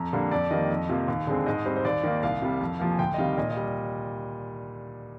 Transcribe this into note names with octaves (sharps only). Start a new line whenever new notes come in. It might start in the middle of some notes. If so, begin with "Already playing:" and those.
Already playing: F2 A#5
D3 G3 A#3
F2 D5
D#3 G3 A#3 D#5
F2
C3 F3 A#3
D#2
D3 G#3 C4
G#2 D#5
G3 C4 C5
C5
D#2 D5
D#3 A#3
C2 F5
C3 G3
F2
C3 F3 A#3
G#5
D2 G5
D#5
C3 D#3 G3 F5
A#2 D#5
D#5
G3